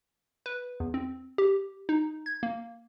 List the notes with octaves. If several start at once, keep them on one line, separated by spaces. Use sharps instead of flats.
B4
E2
C4
G4
D#4
G#6
A#3